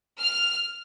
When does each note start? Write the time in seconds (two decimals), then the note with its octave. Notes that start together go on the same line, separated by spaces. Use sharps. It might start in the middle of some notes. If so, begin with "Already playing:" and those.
0.20 F6